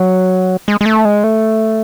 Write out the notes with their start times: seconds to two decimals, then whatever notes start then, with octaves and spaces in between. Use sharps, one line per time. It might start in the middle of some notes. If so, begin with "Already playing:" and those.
Already playing: F#3
0.68 G#3
0.81 G#3
0.86 A3
1.05 G#3
1.24 A3